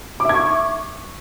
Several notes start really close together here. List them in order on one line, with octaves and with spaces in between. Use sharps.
D6 E5 G#6 C#6